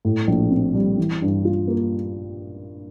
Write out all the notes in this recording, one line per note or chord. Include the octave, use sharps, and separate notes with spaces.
A2
A#1
C4
G3
E3
G2
F4
A#3